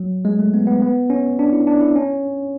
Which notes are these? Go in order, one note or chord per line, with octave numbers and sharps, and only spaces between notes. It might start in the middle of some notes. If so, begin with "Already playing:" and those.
Already playing: F#3
G#3
A3
B3
B3
B3
C#4
D4
E4
D4
E4
C#4